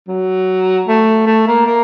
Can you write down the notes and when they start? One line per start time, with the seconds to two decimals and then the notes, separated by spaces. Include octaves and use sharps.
0.08 F#3
0.88 A3
1.26 A3
1.47 A#3
1.66 A#3